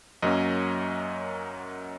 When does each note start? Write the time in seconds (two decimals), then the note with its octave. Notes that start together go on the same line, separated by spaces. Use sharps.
0.22 F#2 F#3 A#3 C#4 D#5